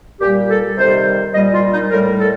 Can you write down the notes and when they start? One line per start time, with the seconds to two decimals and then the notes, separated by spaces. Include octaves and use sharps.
0.21 A#2 G3 G4
0.50 A4
0.78 C3 D#3 G3 C5
1.34 A#2 G3 D#5
1.53 F4
1.72 D#4
1.91 A2 G3 A#4
2.19 A4